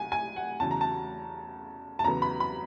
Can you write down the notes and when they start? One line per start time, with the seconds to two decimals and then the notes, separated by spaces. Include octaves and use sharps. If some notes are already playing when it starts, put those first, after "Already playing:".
Already playing: C2 G#5
0.12 G#5
0.36 F#5
0.60 E2 C#3 F#3 A5
0.71 A#5
0.81 A5
1.99 A5
2.04 E2 C#3 F#3 B3 A#5
2.22 B5
2.40 B5